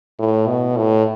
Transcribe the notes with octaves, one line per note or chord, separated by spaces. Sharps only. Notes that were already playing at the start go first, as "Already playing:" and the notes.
A2
B2
A2